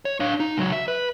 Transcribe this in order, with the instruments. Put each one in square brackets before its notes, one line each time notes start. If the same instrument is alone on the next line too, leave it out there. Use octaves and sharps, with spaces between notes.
[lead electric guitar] C#5
D4 F5
D#4
C#2 F#3
E5
B4